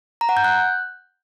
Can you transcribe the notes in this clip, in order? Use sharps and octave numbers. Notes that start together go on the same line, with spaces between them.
A#5
F#5
G6
F#6